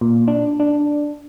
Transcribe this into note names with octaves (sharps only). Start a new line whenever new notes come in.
A#2
D4
D4